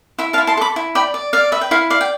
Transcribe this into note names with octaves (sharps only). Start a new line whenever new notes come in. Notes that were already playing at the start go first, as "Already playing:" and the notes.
E4 E5
F5 A5
E4
A5 C6
A4 B5 D6
E4
D5 G5 B5
D5
D5 F5
B4 E5
G5
E4 F5
D5 F5
G5